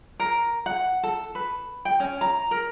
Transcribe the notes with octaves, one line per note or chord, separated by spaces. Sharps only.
A#4
F#5
A4
B4
G5
C#4
A#5
A#4